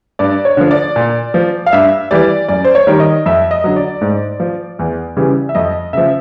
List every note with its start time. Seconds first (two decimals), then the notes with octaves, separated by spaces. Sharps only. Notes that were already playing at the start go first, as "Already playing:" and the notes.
0.19 G2 D5
0.45 C#5
0.57 D3 F3
0.71 D5
0.96 A#2
1.34 F3
1.66 F5
1.73 G2 E5
2.11 E3 G3 D5
2.48 F#2 D5
2.64 C5
2.75 C#5
2.87 D#3 G3
3.00 D#5
3.26 F2 E5
3.51 D#5
3.64 D3 F#3
3.76 D5
4.01 G#2
4.40 F3
4.79 E2
5.17 C#3 E3 G3
5.49 E5
5.55 F2 D#5
5.93 C#3 F3 E5